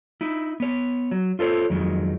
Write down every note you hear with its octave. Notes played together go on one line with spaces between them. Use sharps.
D#4 E4
B3 C#5
F#3
F4 A4 C5 C#5
F2 D#3 F#3 G#3